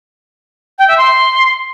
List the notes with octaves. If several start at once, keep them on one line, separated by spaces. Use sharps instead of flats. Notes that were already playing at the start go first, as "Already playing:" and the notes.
G5
E5
C6